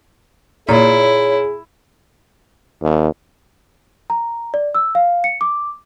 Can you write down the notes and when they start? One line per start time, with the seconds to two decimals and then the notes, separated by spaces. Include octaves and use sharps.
0.69 A#2 E4 G#4 C#5
2.82 D#2
4.10 A#5
4.54 D5
4.75 E6
4.95 F5
5.24 C#7
5.41 D6